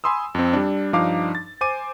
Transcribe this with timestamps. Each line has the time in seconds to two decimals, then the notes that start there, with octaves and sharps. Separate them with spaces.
0.04 G#5 B5 C6 D#6 E6
0.35 F2 C4
0.53 G3 D4
0.93 G2 F3 D4 D#4 F5 D6
1.35 A6
1.61 C5 G#5 D6 D#7